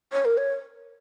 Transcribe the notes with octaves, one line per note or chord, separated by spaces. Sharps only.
C#5
A#4
C#5